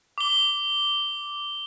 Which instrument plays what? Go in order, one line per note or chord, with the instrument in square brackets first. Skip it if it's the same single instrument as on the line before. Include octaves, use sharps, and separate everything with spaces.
[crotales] D6 G7